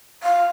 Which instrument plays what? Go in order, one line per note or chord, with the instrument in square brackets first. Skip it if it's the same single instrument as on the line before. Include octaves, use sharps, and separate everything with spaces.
[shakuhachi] F5